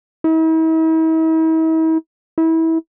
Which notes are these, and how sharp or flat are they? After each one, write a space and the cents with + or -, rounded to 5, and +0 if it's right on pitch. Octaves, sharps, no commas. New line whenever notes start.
E4 -45
E4 -25